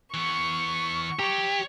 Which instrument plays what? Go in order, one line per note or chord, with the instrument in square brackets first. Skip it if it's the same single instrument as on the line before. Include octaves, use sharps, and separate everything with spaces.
[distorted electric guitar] E3 B3 [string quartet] C#6
[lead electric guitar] G4 [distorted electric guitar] C#5 A#5